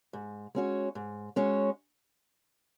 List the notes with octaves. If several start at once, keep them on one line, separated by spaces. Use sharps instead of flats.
G#2
G#3 C#4 F#4 C#5
G#2
G#3 C#4 F#4 C#5